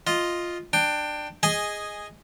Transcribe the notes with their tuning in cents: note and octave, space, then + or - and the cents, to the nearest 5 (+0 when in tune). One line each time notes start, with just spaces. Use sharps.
F4 +0 D#5 +0
D4 +20 G5 +5
G#4 -10 D#5 +0 G#5 +0